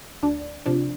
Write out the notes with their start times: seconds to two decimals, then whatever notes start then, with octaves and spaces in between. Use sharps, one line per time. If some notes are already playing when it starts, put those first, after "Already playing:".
0.23 D2 D4
0.66 C3 F3 D4